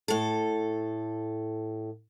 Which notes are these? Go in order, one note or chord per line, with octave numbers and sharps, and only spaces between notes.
A2 A4